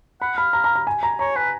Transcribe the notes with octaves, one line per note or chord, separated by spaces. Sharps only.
F#5 B5
F5 B5
A#5
A#5
A#5
G#5
A#5
C#5 A#5
B4 G#5